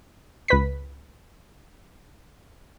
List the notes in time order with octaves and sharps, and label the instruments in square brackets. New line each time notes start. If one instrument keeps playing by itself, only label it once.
[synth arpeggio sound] C#2 B4 B6